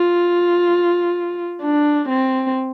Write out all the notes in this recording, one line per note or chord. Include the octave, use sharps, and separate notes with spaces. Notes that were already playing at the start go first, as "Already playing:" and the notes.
Already playing: F4
D4
C4